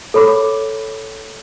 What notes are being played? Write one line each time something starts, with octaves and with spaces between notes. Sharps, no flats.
A4 C#5 B5 D6